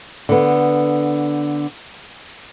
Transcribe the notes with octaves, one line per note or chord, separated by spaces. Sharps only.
D3 B3